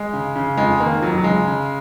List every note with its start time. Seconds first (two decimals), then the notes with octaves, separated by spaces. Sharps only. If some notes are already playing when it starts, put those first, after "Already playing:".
Already playing: G#3
0.13 C#3
0.35 C#3
0.57 F2 G#3
0.80 D#3 A#3
1.02 F2 F#3
1.18 F#3
1.24 C#3 G#3
1.47 C#3